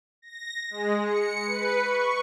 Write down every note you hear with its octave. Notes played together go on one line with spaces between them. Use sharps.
A#6
G#3
C#7
B4
C#6